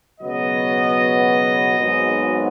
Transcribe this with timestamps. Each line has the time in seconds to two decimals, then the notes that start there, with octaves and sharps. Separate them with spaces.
0.20 C#2 B2 F#3 B3 D#5
1.77 G#1 G#2 F#3 B3